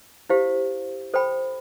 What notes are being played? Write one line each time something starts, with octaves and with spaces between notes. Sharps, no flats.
E4 G4 C5 F5
A4 C5 G5 B5